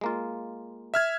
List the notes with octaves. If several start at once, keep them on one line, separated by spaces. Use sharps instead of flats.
G#3 A#3 F4
E5 F6 G#6